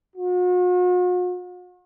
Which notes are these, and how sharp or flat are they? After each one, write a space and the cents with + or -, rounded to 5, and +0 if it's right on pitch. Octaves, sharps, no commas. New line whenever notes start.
F#4 -45